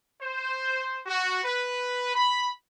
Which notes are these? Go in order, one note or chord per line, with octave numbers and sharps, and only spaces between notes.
C5
F#4
B4
B5